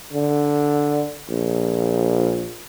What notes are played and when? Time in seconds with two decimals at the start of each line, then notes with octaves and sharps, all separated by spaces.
0.13 D3
1.29 A#1